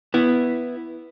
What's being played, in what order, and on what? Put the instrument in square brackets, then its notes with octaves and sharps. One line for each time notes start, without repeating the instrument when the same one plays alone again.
[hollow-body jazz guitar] B3 E4